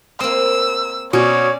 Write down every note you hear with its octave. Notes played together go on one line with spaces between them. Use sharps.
A#3 C4 E6
B2 C#4 C#5 D5